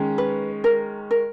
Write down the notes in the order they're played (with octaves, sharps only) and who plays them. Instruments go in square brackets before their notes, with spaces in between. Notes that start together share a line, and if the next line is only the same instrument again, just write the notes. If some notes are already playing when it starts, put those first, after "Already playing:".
Already playing: [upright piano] D#3 G#3 C#4
[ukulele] B4
A#4
A#4